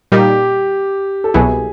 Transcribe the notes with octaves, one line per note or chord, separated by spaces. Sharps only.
A#2 G3 A#3 D#4 G4
A4
C2 B2 F#3 B3 E4 G#4